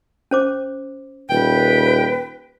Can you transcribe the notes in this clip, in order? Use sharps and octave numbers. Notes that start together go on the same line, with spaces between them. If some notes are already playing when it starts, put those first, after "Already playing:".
C#4 C5 D6
D#1 B4 G5